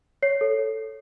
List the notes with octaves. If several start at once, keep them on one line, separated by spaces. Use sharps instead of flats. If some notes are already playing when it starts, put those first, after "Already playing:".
C#5 C7
A4